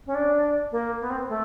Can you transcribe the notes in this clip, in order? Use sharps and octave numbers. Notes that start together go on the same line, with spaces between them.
C#4
D4
A#3
B3
C4
A3